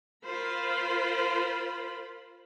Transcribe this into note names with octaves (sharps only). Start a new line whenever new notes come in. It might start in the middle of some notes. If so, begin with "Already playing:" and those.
F4 A#4 C5 B5